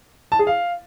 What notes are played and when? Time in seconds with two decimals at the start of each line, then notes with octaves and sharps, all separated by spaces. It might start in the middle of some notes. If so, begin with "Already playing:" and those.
0.32 A5
0.39 G#4
0.47 F5